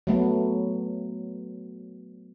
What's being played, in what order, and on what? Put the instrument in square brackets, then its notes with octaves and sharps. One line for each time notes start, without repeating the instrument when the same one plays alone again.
[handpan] F#3 A3 B3